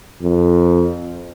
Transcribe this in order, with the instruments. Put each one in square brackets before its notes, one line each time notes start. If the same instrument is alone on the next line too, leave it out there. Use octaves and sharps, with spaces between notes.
[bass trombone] F2